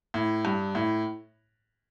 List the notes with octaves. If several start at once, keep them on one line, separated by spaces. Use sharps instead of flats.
A2
G2
A2